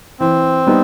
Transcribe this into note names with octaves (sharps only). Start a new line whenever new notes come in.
E3 C4
G3 B3 D#4